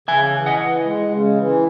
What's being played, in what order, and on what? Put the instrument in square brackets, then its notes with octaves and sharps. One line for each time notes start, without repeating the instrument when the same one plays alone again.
[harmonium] C#3 [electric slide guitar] E5 G#5
[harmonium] E3
[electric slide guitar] D#5 F#5
[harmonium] E3
G#3
C#3
E3